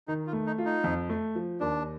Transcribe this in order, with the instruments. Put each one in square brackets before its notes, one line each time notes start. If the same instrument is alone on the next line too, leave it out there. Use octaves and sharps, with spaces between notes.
[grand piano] D#3 [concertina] D#4
[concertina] F4
[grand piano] A3
[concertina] D#4
[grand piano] F4
[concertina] D#4
[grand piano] F2
A3
F3
[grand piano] D#2 [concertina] D4